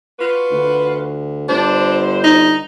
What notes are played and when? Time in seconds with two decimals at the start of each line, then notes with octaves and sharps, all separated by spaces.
0.19 F4 F#4 B4
0.51 D2
1.49 G1 D3 D4 C5
2.24 D#4